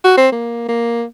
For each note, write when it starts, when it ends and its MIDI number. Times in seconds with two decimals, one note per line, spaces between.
0.04 0.13 66
0.17 0.30 60
0.32 0.64 58
0.68 1.04 58